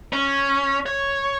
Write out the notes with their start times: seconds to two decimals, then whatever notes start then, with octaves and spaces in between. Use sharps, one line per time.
0.13 C#4
0.86 C#5